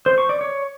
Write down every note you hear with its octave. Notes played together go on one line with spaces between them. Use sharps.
C5
C#6
D5
C#5